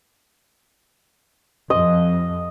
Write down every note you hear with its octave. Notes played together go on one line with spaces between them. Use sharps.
F2 D#5